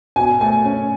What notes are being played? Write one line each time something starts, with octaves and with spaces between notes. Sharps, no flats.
B2 G#5
A3 G#5
C#4